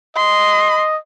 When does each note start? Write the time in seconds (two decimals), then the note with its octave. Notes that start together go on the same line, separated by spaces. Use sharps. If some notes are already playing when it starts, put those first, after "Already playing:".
0.16 D#5 C6